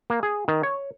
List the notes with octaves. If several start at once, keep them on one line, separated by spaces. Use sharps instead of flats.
A#3
G#4
D#3
C#5